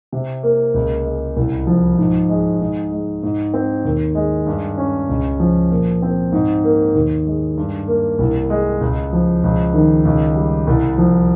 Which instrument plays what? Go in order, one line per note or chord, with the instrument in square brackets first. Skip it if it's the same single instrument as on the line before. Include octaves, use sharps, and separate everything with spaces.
[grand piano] C3
A#3
C#2
G#3
C2
F3
G#2
G#3
G#2
G#3
G#2
C4
D#2
G#3
G2
C#4
C#2
F3
A#2
C4
G#2
A#3
D#2
G#3
G2
A#3
C2
G#3
C#2
F3
C#2
D#3
C#2
G3
C2
F3